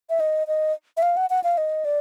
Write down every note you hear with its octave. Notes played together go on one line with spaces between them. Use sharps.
E5
D#5
D#5
E5
F5
F#5
F#5
F5
D#5
D5